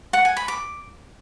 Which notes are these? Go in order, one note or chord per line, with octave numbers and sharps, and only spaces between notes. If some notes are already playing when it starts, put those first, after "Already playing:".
F#5
G#5
B5
D6